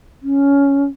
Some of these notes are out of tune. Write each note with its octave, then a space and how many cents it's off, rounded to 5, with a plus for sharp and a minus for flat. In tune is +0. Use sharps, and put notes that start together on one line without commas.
C#4 +10